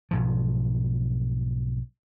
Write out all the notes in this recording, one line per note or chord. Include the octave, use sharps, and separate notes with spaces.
B1 G#2 F3